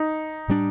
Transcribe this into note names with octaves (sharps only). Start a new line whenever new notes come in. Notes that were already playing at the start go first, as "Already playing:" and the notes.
Already playing: D#4
A2 G3 A#3 D4